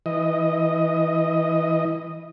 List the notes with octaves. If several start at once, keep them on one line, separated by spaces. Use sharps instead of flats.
E3 D#5